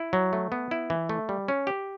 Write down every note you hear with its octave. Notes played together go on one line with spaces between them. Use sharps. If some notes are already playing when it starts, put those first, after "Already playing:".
Already playing: E4
F#3
A3
B3
E4
E3
A3
G3
C#4
G4